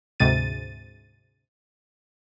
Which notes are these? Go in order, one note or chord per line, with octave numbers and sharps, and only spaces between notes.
D2 G#2 C3 A6 D#7